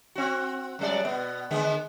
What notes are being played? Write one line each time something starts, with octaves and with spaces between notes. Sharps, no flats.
C4 F#4
F#2 G3 D5
B2 B3
D3 G#3 B3